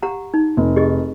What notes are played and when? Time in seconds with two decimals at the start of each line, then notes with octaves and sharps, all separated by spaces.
0.03 G4 F#5 A#5
0.34 D#4
0.57 F1
0.76 G4 G#4 D#5